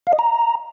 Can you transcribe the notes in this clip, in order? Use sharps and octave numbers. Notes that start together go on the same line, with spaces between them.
F5
D#5
A#5